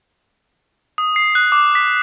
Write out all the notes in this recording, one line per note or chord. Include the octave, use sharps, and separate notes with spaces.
D#6
C7
F#6
D6
B6